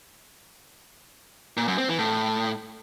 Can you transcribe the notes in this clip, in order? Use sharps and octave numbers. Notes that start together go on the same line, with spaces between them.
A#2
F#2
C4
E3
A2